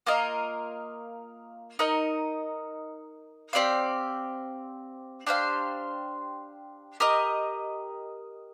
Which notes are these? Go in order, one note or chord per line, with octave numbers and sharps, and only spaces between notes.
A#3 F4 A#4 D#5
D#4 A#4 D#5
C4 G4 D5 F5
D4 G4 C5 F5
G4 A#4 D#5